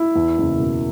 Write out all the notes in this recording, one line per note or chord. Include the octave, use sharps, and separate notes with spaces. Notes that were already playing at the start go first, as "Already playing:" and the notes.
Already playing: E4
E2
F#1
B2